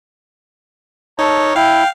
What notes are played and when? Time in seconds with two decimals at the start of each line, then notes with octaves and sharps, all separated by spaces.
1.19 D#4 A4 A#4 C#5 A5
1.56 E4 F5 G5